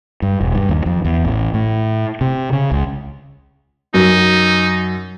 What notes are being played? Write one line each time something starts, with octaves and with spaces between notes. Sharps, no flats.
G2
E1
G2
D#2
F2
E2
A1
A2
C3
C#3
C#2
F#2 D#4